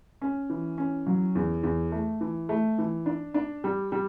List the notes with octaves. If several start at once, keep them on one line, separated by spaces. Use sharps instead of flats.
C#4
E3
C#4
F#3
E2
E2
A3
E3
A3
E3
D4
D4
G3
G3